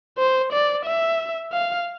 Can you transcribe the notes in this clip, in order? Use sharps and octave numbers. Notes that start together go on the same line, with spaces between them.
C5
D5
E5
F5